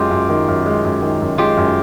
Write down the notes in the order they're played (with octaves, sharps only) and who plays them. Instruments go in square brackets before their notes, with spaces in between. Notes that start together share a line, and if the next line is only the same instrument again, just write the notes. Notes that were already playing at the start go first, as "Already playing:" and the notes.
Already playing: [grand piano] F#2 G#3 [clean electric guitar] F4 G4
[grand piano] F#2
D#3
F#2
G#3
F#2
D#3
F#2
[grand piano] G#3 [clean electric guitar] F4 G4
[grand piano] F#2